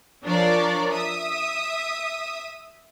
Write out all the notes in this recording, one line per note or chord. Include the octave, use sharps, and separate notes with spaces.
F3 D4 A#4 C#5 D5
E5 D#6